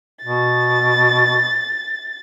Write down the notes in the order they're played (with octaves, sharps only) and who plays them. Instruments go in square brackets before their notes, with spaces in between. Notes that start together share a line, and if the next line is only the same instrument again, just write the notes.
[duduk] B2 [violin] A6